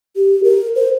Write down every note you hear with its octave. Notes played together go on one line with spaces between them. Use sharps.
G4
A#4
C5